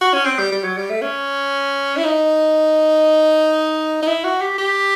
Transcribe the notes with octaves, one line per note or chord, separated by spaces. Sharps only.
F#4
C#4
C4
G3
G3
F#3
G3
A3
C#4
E4
D#4
D#4
E4
F#4
G4
G4